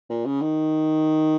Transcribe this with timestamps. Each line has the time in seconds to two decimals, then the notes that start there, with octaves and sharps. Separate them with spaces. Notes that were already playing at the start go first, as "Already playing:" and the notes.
0.09 A#2
0.25 C#3
0.41 D#3